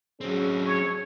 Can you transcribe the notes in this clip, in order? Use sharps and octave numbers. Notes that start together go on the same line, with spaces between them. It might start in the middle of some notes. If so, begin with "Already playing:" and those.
F#3 C4 C#4 G#4
C#5